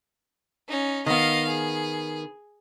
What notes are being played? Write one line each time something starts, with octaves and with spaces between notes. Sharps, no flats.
C#4 D#4
D#3 B3 D#5 F5
G#4